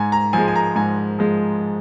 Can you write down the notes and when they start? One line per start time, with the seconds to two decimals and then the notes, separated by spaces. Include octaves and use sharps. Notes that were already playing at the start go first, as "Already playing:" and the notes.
Already playing: G#2 G#5
0.12 A#5
0.33 F3 G#3 G#5
0.48 G#5
0.56 A#5
0.76 G#2 G#5
1.19 F3 G#3